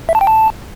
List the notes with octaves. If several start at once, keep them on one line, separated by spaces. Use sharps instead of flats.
E5
A5
G5
A5